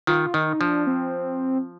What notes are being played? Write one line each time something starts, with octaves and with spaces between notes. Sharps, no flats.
D#3 F4
D#3 D#4
F3 D4
C4